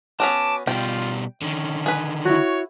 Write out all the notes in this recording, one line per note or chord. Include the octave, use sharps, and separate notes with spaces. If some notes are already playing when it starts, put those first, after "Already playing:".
B3 C#4 F#4 A5 D6
B2 G3 F4 G5
D3 D#3 C#4
G#4 B4
E4 F#4 C#5